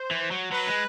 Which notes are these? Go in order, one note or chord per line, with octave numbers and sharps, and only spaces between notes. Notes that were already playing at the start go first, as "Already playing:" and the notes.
Already playing: C5
E3
F#3
F#3 B4
G#3